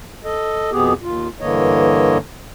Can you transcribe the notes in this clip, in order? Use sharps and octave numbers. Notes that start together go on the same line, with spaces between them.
A4 D#5
F2 B2 B3 G4 G#4
D#2 F4
G2 D3 E3 A#3 C#5 D#5